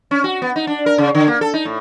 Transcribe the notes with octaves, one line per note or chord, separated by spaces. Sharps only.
C#4
F#4
B3
D#4
D4
A#4
C#3
D3
A#3
A4
D#4
A2